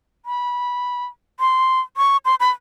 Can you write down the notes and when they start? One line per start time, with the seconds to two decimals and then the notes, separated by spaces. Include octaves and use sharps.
0.26 B5
1.40 C6
1.97 C#6
2.25 C6
2.40 B5